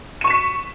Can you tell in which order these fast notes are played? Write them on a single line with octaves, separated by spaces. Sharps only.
D#7 C#6 E7 B6